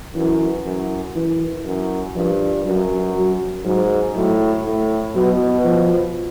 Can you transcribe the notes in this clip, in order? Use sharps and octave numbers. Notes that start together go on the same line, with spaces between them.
F#2 E3
F#2
E3
F#2
G2 F3
F#2 F#3
F#3
G#2 F#3
A2 F#3
A2
B2 F#3
F3